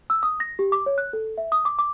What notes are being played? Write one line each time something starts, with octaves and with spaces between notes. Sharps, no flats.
E6
D#6
A#6
G4
D6
C#5
F#6
A4
E5
D#6
D6
D6